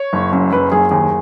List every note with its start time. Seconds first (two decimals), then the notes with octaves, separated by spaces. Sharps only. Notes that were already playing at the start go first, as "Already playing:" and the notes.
Already playing: C#5
0.13 F#1
0.32 F#2
0.52 F#1 B4
0.72 F#1 G#4
0.91 D#2 G#4